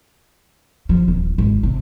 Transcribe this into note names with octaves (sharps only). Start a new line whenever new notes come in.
F3
D#1
G#1
C3